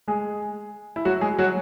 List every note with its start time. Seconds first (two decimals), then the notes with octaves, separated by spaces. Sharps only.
0.08 G#3 G#4
0.96 E4
1.05 F#3 F#4
1.21 G#3 G#4
1.38 F#3 F#4